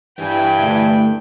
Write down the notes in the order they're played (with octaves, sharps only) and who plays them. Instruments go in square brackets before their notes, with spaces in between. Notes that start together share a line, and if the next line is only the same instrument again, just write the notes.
[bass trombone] G2 [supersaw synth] E3 G#5 [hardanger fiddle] E4 G5
[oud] D2 A3